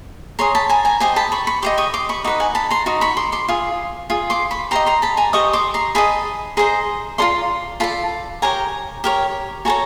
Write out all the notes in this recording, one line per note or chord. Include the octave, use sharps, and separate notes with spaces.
G#4 C#5 A#5 C6
A5 B5
G#5 A#5
G#5 A#5
G4 C5 D#5 G#5 A#5
A5 B5
B5 C#6
B5 C#6
G4 C5 D#5 C6 D6
C#6 D#6
C6 D6
B5 C#6
D#4 F#4 B4 D#5
F#5 G#5
A5 B5
A#5 C6
D#4 F#4
B5 C#6
C6 D6
C6 D6
F4 G#4
F4 G#4
C6 D6
B5 C#6
G4 C5 D#5 A#5 C6
A#5 C6
A5 B5
G#5 A#5
G4 C5 D#5 C#6 D#6
C6 D6
A#5 C6
G#4 C5 D#5 A5 B5
G#4 C5 D#5 A#5 C6
F4 A4 D5 A#5 C6
F4 A4 D5 A5 B5
G4 A#4 C#5 G#5 A#5
G4 A#4 C#5
F#4 A4 C#5 G#5 A#5